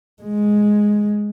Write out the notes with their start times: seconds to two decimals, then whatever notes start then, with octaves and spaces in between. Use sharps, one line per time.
0.23 G#3